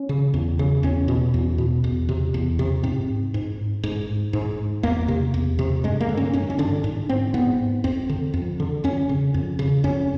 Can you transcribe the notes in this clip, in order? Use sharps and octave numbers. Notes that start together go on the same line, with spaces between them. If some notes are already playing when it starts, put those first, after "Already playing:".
Already playing: C#4
C#3
E2
C#3
E2 C#4
B2
E2
B2
E2
C3
E2
C3
G#2 C4
G#2
G#2
G#2
E2 A#3
C3
E2
C3
G2 G#3
A#3
D3
C#4
G2 C#4
C#4
D3 D4
G#2
C4
G#2 B3
F2 C4
D3
F2
D3
F2 C#4
C#3
F2
C#3
F2 C#4